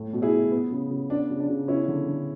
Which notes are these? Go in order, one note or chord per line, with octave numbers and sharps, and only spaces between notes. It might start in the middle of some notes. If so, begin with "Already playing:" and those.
Already playing: A2 A3
B2
E4 G#4
B2
B3
C#3
C#3
B3 D4
C#3
D4
C#3
B3 C#4 E4
D3
D3